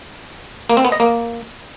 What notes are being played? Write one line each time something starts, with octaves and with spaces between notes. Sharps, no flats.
A#3
C4
B3
D#5
A#3